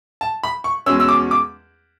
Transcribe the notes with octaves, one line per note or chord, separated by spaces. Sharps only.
A5
B5
C#6
E2 B2 G#3 C#4 E6
E6
D6
D6